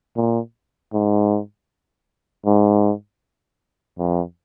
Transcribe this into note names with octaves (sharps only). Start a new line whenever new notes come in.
A#2
G#2
G#2
F2